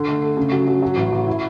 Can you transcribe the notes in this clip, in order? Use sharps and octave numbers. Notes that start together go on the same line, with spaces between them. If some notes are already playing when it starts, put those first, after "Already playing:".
Already playing: D3
A3
A3
C#3
F#3
F#3
F#3
A1
A1
E4